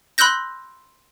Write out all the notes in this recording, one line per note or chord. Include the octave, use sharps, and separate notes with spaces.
B5 C6 E6 F#6 G6 A#6